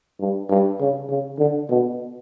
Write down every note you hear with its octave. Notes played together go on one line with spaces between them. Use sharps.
G2
G2
C#3
C#3
D3
B2